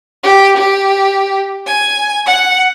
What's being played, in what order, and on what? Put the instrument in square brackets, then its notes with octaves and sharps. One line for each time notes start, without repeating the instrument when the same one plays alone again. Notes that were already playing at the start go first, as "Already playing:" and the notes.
[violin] G4
G4
G#5
F#5